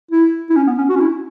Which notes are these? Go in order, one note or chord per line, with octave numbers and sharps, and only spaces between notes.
E4
E4
C#4
B3
C#4
F#4
C#4
E4